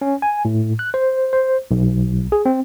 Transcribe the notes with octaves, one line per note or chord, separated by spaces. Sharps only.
C#4
G#5
A2
F#6
C5
C5
B1
G#4
C4